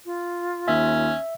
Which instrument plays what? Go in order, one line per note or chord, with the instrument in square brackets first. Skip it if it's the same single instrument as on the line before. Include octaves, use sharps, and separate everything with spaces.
[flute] F4
[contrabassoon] D#2 [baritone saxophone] C#4 [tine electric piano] E5